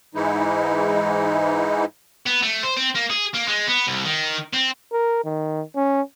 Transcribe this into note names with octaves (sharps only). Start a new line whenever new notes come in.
G#2 E3 G#3 D#4 E4
B3
A3
C5
C4
A#3
G#4
A#3
G#3
B3
C2
D#3
C4
A#4
D#3
C#4